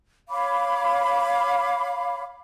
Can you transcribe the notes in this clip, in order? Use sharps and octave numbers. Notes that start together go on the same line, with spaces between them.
C#5 F5 B5 D6